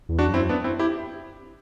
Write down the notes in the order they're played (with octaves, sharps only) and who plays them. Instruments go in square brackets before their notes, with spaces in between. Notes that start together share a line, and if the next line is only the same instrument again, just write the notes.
[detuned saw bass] E2
[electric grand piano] D4 F#4
[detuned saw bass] F#2 [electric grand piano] C4 E4
[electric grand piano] B3 D4
C4 E4
E4 G4